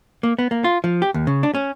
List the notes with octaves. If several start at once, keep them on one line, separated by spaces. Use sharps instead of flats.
A#3
B3
A#3
F4
F3
G4
D#2
C#3
D4
C#4